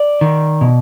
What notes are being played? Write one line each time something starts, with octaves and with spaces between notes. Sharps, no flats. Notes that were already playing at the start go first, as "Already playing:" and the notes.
Already playing: D5
D#3
B2